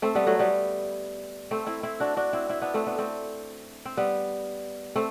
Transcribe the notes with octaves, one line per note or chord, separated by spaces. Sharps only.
A3 C4
G3 B3
F#3 A3
G3 B3
A3 C4
C4 E4
C4 E4
D4 F#4
D4 F#4
C4 E4
C4 E4
B3 D4
A3 C4
B3 D4
A3 C4
C4
G3 B3
A3 C4